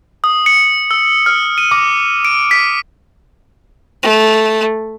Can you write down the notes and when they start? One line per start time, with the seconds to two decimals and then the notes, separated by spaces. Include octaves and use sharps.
0.24 D#6
0.46 C#7
0.91 E6
1.26 F6
1.58 D#7
1.71 D6
2.25 D7
2.51 B6
4.03 A3